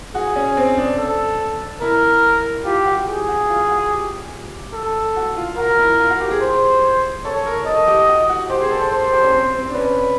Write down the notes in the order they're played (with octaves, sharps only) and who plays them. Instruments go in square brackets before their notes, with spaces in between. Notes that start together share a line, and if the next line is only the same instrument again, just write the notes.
[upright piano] F#4 [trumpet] G#4
[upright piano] C#4
C4
D4
[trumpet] A4
[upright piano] E4 [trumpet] A#4
[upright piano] F4 [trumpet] G4
[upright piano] F#4
[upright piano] G4 [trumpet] G#4
[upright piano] F#4
F4
F#4
G4
[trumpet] A4
[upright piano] F#4
F4
[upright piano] F#4 [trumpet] A#4
[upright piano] E4
F4
F#4
G4
G#4
[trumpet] C5
[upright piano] A4 [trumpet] C#5
[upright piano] A#4
[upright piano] A4 [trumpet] D#5
[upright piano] G4
F#4
F#4
[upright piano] G4 [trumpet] C5
[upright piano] G#4
A4
A4
[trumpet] C5
[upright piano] A4
G4
C#4
C4
C4
D4
[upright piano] C#4 [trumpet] B4